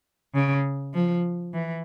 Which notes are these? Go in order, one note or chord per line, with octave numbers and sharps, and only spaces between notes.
C#3
F3
E3